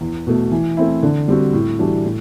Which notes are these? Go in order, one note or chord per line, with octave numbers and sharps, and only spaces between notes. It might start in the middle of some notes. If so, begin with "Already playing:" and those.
E2
B2 A3
E3
A3 C4 E4
D3
G3 C4 F#4
A2
E3 G3 D4 F#4
A2